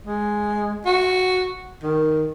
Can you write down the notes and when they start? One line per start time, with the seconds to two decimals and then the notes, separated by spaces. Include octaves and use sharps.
0.06 G#3
0.85 F#4
1.83 D#3